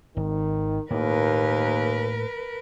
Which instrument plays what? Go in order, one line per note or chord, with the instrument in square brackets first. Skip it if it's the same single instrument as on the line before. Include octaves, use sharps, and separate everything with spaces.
[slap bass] G#1 [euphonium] D#3
[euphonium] D#2 [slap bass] A2 A#3 [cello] A#4 B4